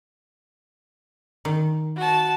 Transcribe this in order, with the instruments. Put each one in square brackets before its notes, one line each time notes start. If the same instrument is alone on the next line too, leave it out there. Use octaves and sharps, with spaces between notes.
[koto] D#3
[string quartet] F#4 A5